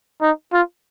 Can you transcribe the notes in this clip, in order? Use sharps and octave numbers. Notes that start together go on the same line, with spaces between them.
D#4
F4